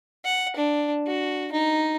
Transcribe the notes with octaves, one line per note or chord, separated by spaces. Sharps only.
F#5
D4
F#4
D#4